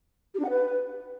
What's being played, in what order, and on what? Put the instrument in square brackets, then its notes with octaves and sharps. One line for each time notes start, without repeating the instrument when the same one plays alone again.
[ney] G4
D4
F#5
B4